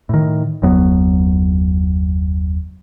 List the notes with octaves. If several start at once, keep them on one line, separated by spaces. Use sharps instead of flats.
A2 D#3
F#1 D#2 F#3 B3